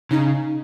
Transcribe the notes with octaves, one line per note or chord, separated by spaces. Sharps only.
C#3 D#4